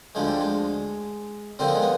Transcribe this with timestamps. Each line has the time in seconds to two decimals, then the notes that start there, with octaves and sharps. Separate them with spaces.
0.15 D2 D3 F3 G#3
0.27 G3
0.40 G#3
1.59 D#2 D3 F3 C4
1.68 B3
1.75 G#3
1.82 B3